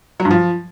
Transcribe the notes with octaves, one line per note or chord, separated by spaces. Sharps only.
F#3
G2
F3